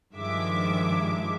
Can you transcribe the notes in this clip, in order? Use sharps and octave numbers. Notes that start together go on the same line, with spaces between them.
G2 D#3 F3 G#3 E5 D6